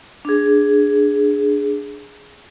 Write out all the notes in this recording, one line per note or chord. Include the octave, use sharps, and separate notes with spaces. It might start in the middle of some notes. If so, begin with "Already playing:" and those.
D4 G#4